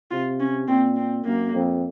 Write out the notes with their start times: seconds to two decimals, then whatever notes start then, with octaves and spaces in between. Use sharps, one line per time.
0.11 C3 F4
0.40 C#4
0.68 A#2 C4
0.96 C4
1.25 F#2 A#3
1.54 F2